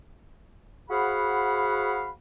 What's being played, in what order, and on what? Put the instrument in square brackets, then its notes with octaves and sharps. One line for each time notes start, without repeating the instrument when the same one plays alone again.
[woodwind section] F#4 G#4 C5 F5 F#5 B5